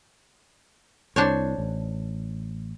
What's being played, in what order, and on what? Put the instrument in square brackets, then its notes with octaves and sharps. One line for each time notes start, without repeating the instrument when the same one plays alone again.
[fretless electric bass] C2 [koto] D4 C5 C#5
[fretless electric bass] A1